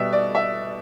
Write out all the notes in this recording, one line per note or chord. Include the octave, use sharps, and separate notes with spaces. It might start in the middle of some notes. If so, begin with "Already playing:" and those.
Already playing: B2 G3 B3 E5
D5
E5